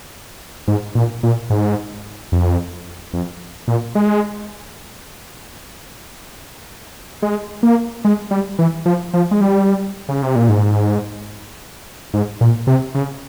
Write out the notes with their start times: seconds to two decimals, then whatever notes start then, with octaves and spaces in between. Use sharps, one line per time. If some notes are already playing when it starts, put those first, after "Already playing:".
0.68 G#2
0.95 A#2
1.23 A#2
1.50 G#2
2.32 F2
3.14 F2
3.68 A#2
3.95 G#3
7.22 G#3
7.63 A#3
8.05 G#3
8.31 G3
8.59 E3
8.86 F3
9.14 F3
9.31 G#3
9.41 G3
10.09 C#3
10.22 C3
10.36 A#2
10.49 G#2
12.14 G#2
12.41 A#2
12.67 C3
12.95 C#3